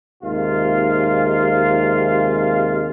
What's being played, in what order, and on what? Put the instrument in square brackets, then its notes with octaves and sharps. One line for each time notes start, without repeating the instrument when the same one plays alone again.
[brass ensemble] D#2 C3 G#3 F4 F5